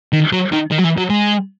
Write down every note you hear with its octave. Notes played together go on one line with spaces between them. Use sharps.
D#3
F#3
D#3
D#3
F#3
E3
F#3
G#3